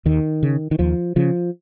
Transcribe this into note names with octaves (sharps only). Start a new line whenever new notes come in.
D#2 D#3
C#3
D#3
D#2 F3
C#3 F3